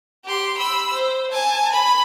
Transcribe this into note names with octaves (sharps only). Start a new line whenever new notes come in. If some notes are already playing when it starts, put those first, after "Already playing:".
G4 C6
B5 E6
C5
G#5 A5
B5